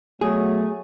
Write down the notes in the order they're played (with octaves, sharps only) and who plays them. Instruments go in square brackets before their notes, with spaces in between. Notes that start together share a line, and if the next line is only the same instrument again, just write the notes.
[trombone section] B2 F#3 [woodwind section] A3 [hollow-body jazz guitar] G#4